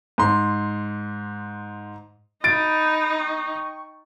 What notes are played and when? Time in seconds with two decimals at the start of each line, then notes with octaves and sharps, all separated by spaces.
0.18 G#2 C6
2.44 D#4 B5 A6 D7
3.20 G5 C#6